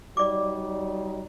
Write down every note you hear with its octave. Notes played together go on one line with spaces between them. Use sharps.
F#3 G3 D#4 D5 D6